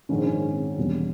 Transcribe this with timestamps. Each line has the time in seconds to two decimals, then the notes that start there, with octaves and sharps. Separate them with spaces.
0.09 A#1 G#2 D#3 C#4
0.17 C4
0.26 C#4
0.77 E1 E2 B2 G3